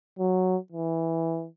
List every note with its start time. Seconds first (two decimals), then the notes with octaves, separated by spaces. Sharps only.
0.19 F#3
0.72 E3